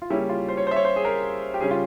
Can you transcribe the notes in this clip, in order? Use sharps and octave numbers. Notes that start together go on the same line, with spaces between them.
F4
C#3 G3 A#3 C#4 E4
F4
C5
C#5
C5
E5
C#5
C5
G#4
A#4
G4
C#3 G3 C#4 G#4
F4